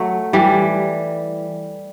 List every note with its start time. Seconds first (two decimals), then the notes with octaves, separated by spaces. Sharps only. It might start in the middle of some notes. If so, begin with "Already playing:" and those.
Already playing: F#3 A3
0.33 E3 G3